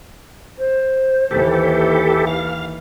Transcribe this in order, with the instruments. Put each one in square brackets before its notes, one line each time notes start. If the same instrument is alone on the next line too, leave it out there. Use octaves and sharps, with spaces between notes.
[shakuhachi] C5
[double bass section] D#2 E3 [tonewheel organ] G4 A4
[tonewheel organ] F5